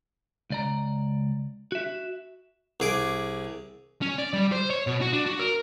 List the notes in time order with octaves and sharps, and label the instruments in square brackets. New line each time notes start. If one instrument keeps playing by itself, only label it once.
[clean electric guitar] C#2 D5 A#5
F#4 E5
[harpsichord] C2 G#4 D6
[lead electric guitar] C#4
D5
G3
C5
C#5
B2
F#4
D4
F#4
A#4